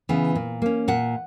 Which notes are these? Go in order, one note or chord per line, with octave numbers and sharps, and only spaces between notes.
C#3 E3 B3
A#2
A#3 C#4
A#2 F#5